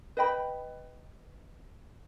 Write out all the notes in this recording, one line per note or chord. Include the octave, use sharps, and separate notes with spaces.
B4 D#5 G5 B5